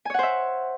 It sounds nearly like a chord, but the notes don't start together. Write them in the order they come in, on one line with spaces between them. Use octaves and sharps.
G#5 C#5 F#5 C5 E5